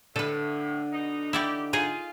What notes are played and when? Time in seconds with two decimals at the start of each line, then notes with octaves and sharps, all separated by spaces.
0.16 A2 D3 A4 B4
0.93 B2 D#4
1.33 D#4 E4 G4 D5 G5
1.73 D#4 F4 G#4 D#5